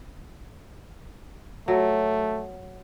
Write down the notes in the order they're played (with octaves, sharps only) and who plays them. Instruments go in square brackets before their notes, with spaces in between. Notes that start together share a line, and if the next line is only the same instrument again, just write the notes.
[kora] F#3 [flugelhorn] A3